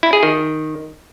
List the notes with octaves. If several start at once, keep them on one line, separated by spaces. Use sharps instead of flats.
E4
G#4
D#3